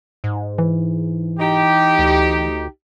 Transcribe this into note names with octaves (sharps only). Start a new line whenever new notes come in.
G#2
E3
D#4 G4
D2